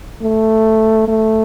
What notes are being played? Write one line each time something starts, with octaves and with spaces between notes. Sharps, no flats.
A3
A3